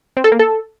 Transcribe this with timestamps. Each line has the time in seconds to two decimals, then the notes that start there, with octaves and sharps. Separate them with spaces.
0.17 C4
0.24 A4
0.32 A#3
0.39 A4